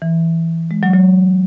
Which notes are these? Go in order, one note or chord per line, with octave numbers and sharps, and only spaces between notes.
E3
G#3
F#3
F#3